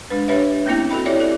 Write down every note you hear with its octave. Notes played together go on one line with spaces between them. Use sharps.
G#3 D4 B4
D4 G4 B4 C#5 D#5 E5
A3 A#3 C4 C#4 E4 G5
F#4 A4 D#5 B5
E4 G4 C#5 D5 E5
E4 A4 D5